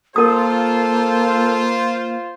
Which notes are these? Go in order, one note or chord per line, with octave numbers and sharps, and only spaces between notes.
A#3 F4 A4 A#4 C5 D#6